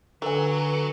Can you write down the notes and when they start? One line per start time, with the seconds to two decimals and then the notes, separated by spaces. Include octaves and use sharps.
0.22 D3 F#3 A4 B4 G#5